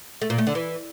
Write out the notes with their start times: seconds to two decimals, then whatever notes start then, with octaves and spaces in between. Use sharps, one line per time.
0.22 A3
0.30 A#2
0.38 A3
0.47 D3
0.55 E3